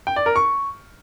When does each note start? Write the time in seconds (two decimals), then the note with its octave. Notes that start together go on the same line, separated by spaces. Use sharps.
0.07 G5
0.16 D5
0.26 A#4
0.36 C#6